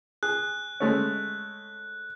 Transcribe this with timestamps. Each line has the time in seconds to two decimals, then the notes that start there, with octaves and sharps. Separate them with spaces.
0.23 G#4 F#6
0.80 G#3 A3 C#4